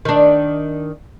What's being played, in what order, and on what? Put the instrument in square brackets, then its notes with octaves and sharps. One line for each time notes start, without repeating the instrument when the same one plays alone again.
[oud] D#3 D4